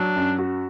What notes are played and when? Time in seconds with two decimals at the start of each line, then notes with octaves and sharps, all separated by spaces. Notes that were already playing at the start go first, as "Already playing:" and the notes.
Already playing: F#3 D4
0.16 F#2
0.39 F#4